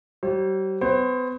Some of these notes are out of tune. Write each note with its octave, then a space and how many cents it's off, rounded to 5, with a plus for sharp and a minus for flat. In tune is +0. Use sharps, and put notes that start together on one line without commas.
G3 -40 C5 +40
B3 +40 C5 +30